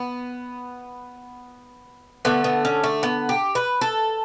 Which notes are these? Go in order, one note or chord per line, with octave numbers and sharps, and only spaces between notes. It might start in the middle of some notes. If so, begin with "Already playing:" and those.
Already playing: B3
D3 A3 B3
B3
C#4
A3
B3
G4
B4
A4